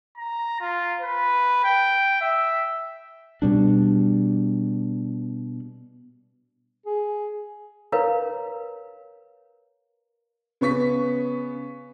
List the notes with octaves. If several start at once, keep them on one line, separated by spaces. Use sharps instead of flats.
A#5
F4
B4
G5
E5
B2 G3 D4
G#4
A#4 B4 C#5 F5 A#5
C#3 B3 C#6 B6